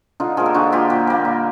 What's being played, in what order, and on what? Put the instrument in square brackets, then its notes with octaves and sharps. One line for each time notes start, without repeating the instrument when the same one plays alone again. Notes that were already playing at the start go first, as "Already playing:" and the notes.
[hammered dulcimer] D3 D#4 F4
F3 A#3 G#4 A#4
G4 A4
D3 F#4 G#4
F3 A#3 F4 G4
A#2
G3 A#3
A#2